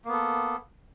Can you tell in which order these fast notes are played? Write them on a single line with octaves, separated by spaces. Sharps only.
A#3 B3 A4